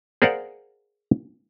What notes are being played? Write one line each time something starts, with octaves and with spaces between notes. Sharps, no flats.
G#4 A#4 C5 D5 F5 F#5